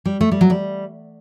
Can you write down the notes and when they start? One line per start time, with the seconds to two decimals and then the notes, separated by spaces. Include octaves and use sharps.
0.06 G3
0.21 A3
0.32 G3
0.41 F#3
0.50 G3